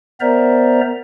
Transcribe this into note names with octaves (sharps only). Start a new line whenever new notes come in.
B3 A#4 C5 D5 E5 A#5